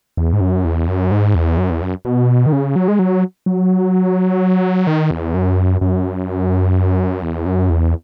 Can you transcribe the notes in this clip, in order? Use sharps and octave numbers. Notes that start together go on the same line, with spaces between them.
E2
G#2
F#2
E2
F#2
G#2
E2
F#2
E2
F#2
B2
D#3
C#3
F#3
G#3
F#3
F#3
D#3
E2
F#2
F#2
E2
F#2
E2